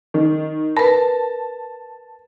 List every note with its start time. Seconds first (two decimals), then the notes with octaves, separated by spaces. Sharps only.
0.14 D#3
0.77 A#4 B4 A5